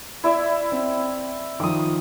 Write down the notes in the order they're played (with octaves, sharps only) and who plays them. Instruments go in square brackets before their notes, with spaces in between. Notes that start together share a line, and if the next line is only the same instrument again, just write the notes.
[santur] E4 D5 E5
[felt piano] C4
[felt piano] D#3 F3 [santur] D6 D#6